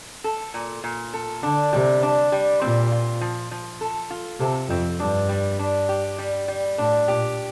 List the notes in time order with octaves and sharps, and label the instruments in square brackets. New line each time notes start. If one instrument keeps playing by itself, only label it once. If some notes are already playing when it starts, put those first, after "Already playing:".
[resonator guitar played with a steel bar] A4
A#2
A#2
A4
[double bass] D3 [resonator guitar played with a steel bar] D4
[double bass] C3 [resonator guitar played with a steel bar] G3
[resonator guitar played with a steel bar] D4
G3
[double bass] A#2 [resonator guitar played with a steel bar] C4
[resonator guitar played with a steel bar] F4
F3
F3
A4
F4
[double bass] C3 [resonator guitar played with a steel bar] A4
[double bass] F2 [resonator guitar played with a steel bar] C4
[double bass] G2 [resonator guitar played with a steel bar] D4
[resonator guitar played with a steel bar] G3
D4
G4
G3
G3
[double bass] A2 [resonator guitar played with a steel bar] D4
[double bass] A#2 [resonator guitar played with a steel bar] G4